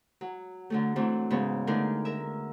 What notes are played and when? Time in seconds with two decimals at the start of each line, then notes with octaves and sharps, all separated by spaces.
0.21 F#3
0.70 D3 F#3 A3
0.96 E3 F#3 A3 C4 D4
1.30 G#2 C#3 B3 C#5
1.67 D3 A3 D4 D#4 G#4 A#4
2.05 A#4 E5